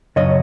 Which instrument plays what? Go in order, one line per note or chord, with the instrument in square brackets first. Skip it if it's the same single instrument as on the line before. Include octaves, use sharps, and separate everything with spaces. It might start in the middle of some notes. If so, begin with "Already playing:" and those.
[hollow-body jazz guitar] F#2 C#3 F#3 C#5 D#5